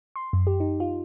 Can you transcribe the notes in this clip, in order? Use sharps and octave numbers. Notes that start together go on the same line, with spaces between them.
C6
F#2
G4
D#4
F4